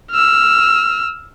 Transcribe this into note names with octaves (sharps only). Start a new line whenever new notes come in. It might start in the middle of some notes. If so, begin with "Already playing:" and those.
E6 F6